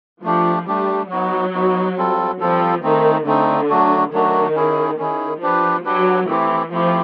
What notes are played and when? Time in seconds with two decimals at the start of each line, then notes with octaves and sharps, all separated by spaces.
0.24 F3 A3 D4 G4
0.68 G3 A3 D4 G4
1.11 F#3 B3 D#4 F#4
1.54 B3 D#4 F#4
1.97 G3 C4 F4 A4
2.40 F3 G3 C4 F4 A4
2.83 D#3 A3 C4 D#4
3.26 D3 A3 C4 D#4
3.70 F#3 A3 D4 F#4
4.12 D#3 F#3 A3 D4 F#4
4.55 C#4 E4 G#4
4.99 D#3 C#4 E4 G#4
5.42 F3 D4 G4 B4
5.85 F#3 D4 G4 B4
6.29 E3 A3 C4 E4 G4
6.71 F3 A3 C4 E4 G4